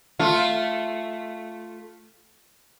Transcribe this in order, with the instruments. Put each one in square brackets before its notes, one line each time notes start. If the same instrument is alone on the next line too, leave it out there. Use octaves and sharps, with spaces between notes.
[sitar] A3 F4